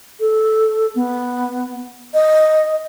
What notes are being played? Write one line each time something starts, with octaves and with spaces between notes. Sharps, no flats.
A4
B3
D#5